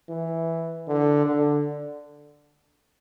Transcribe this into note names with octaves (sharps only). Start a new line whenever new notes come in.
E3
D3
D3